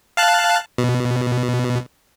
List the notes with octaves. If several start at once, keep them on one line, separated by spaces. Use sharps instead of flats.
F5 A5 F#6
B2